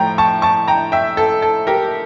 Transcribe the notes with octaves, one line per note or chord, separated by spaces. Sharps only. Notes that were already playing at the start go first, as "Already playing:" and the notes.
Already playing: A2 F3 A3 G5 A#5
A5 C#6
A5 C#6
G5 A#5
E5 G5
A4
A4
G4 A#4